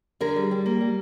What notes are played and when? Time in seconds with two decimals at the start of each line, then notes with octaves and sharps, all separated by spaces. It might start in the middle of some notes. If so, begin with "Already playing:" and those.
0.21 D3 G#4 A#4
0.36 G3
0.51 G3
0.66 A#3
0.81 G3